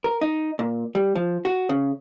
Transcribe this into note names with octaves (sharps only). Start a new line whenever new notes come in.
A#4
D#4
A#2
G3
F3
F#4
C#3